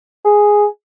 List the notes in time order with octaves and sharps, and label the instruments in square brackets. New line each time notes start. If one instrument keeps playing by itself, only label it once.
[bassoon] G#4